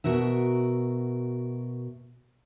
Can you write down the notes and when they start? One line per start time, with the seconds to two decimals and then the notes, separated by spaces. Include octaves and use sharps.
0.04 B2 F#4 A#4 E5